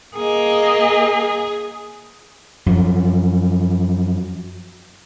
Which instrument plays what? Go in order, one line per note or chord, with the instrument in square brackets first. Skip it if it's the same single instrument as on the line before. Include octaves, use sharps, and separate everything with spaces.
[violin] A#3 D#5 [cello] G#4
[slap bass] F#2 F3